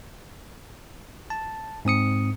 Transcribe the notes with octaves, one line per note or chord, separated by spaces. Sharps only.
A5
G#2 C4 D#6 C#7